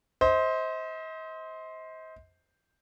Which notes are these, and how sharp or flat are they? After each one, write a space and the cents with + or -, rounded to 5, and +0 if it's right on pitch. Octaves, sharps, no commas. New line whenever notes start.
C5 +0 D#5 +40